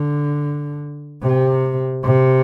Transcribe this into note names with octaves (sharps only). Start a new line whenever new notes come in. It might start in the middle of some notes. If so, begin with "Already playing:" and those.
Already playing: D3
C3
C3